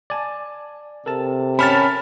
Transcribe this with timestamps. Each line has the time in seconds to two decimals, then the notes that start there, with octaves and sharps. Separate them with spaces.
0.10 D5 G#5 A5
1.06 C3 A4 A#4 A5
1.59 C#4 A4 A#4 C#5 G5 B5 F6 A6